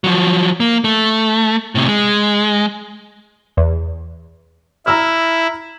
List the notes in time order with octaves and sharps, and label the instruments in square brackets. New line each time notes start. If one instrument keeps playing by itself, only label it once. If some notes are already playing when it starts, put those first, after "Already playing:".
[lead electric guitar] F3 F#3
A#3
A3
A2 C3
G#3
[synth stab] E2
[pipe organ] E4 [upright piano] A#5 E6 F6